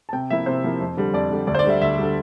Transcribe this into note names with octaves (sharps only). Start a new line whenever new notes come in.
A5
C3 G5
F3 A#3 E4 E5
C3 C5
F3 A#3 E4
F2
D3 G3
F2 D5
D3 G3
D2 D5
C5
D5
D3 G3 E5
D2 E5
D3 G3